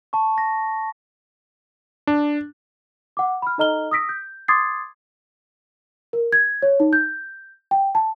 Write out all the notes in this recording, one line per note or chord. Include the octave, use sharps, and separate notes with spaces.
A5 C#6
A#6
D4
F#5 D6
B5 F6
D#4 A4 D#5 A#5 F6 G7
D#6 E6 A#6 B6 D7
G6
C6 D6 D#6 G#6 A6 C7
A#4
G#6
C#5
D#4
G6
G5
A5